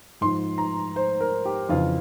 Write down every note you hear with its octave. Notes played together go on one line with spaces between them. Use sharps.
G#2 F3 C6
A#5
C5
A#4
G4
F2 C#3 E3 F4